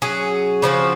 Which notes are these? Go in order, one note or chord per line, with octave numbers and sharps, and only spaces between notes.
F#3 C#4 G#4
C#3 F3 C4 F#4